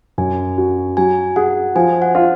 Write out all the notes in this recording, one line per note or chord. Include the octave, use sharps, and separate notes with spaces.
F#2 G#5
F#4
F#3 G#5
G#4 F#5
F3 G#5
F#5
F4